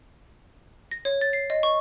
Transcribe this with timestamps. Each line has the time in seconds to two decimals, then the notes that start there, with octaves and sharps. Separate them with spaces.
0.91 A#6
1.05 C#5
1.21 A6
1.33 C7
1.50 D#5
1.63 C#6